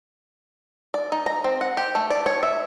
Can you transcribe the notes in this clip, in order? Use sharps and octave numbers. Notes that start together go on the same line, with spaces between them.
D5
D#4
A#5
C4
F#5
G4
A3
D5
C#5
E5